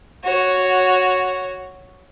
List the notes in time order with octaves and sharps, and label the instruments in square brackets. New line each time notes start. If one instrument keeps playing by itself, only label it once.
[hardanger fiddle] F#4 C#5